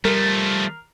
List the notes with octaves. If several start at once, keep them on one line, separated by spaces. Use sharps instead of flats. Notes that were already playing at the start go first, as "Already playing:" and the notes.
F3 G3 A3 A#4